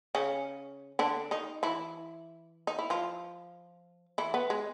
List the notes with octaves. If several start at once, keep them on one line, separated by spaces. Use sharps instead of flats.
C#3 C#4
D3 D4
D#3 D#4
E3 E4
D#4
E4
F3 F4
E3 E4
B3
G#3